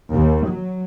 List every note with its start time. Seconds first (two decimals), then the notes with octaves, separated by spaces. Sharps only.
0.11 D#2
0.47 F#3